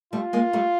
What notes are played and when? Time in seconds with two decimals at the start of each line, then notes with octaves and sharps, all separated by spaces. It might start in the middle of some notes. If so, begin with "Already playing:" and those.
0.13 G3 A3 F4
0.33 G#3 A#3
0.53 G3 A3